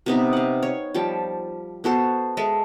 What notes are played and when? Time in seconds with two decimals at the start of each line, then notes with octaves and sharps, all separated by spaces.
0.06 C3 B3 D#4 B4
0.33 F5 F#5
0.63 C#5
0.94 F3 G3 G5 A5
1.84 B3 F#4 A4 C5
2.37 G#3 A4 E5